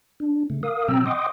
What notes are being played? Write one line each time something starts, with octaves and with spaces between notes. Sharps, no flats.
D4
C#3 A3
A#4 F5 D#6
B2 F#3 C4 G5 A#5 E6
D#5 F#5 G5 C6 D6 D#6